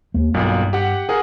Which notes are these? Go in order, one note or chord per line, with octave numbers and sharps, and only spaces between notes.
D#2 A#3
B1 G2 A#2
G4 F#5
G#4 A#4 F#5